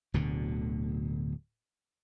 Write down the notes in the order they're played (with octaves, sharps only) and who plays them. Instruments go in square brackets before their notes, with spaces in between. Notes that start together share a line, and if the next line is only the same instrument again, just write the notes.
[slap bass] D1 D2 B2 D3